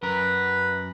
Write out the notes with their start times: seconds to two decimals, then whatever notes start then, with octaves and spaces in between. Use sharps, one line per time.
0.03 F#2 A#4 B4